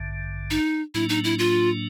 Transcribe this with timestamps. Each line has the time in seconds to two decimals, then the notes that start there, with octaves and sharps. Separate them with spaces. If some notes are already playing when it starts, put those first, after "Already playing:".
Already playing: A1 G2 D3
0.51 D#4
0.94 A2 F#3 A#3 D4 E4
1.09 D#4
1.24 E4
1.39 F4